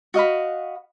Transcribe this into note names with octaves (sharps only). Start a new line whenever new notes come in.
F#4 D#5 F5 B5